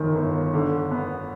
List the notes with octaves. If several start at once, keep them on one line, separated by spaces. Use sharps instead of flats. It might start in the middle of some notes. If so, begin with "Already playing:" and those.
Already playing: G1 F#2 D#3
G1
D3
B3